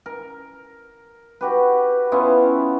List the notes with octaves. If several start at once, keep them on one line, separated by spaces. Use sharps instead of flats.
A#4
F#4 G4 B4
B3 C#4 E4 F4